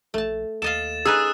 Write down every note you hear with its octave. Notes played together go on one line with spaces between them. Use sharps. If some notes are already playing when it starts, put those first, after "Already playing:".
A#1 A3 A5
D#2 A4 D#5 F5 A6 E7
C#4 D#4 G#4 B4 E6 F#6